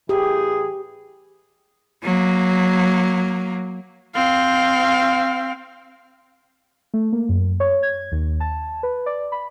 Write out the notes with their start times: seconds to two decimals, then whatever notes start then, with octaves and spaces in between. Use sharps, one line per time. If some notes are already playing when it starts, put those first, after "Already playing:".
0.09 A2 E3 G4 G#4
2.03 F#3 A#3
4.15 C4 F5
6.94 A3
7.12 A#3
7.29 F#2
7.60 C#5
7.83 G#6
8.12 D#2
8.40 A5
8.83 B4
9.06 D5
9.32 B5